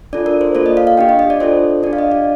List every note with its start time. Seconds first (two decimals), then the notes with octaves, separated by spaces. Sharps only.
0.13 D4 F4 A4 D5
0.26 A#4
0.41 C5
0.55 A#3 F4 A4 D5
0.66 D#5
0.77 F5
0.87 F5
0.97 D4 G4 G5
1.09 D#5
1.19 D#5
1.30 D5
1.40 D4 F4 A4 C5
1.83 D4 D5
1.86 G4
1.93 F5
1.98 D#5
2.12 D5